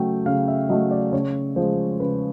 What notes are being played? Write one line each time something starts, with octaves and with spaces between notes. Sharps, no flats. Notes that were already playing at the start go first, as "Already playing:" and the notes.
Already playing: C#3 F#3 A3 G5
C#3 F5
E5
F#3 A3 D#5
D5
C#3 C#5
F3 G#3 C5
C#3 B4